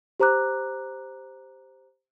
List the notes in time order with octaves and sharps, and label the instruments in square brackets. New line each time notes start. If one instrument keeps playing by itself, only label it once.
[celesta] G4 C5 A#5 D6 F#6